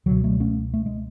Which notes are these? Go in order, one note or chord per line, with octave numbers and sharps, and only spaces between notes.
C#2 B2 D3 F#3
F#3 A3
A3 C#4
A3
G#3